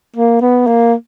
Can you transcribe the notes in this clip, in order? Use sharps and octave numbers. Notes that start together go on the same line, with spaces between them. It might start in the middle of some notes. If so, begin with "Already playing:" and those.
A#3
B3
A#3